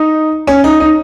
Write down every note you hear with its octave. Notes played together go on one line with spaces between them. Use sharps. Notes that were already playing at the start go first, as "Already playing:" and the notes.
Already playing: D#4
C#4
D#4
D#4